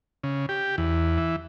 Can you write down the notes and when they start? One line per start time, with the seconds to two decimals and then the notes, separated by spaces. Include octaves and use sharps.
0.24 C#3
0.49 G4
0.78 E2
1.18 E3